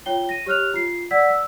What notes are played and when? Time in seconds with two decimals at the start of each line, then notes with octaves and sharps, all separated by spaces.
0.06 F4 C#5 G5 G7
0.29 A#6 D#7
0.46 G4 C#5 F6 F#6 F7
0.74 F4 C7
1.11 D5 F#5 E6 B6
1.29 E6